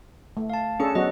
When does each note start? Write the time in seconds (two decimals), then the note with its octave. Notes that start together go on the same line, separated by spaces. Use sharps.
0.37 A3
0.50 F5 A5
0.80 C#4 D4 G#4 A4 C#7
0.95 F#3 B3 F#4 D#5